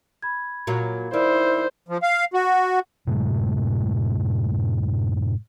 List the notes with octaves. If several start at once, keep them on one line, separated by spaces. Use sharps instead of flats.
B5 G#6
A#2 F#3
D#3 E4 C5 D5 B5
F3
F5
F#4
F#2 A2 C3 G#3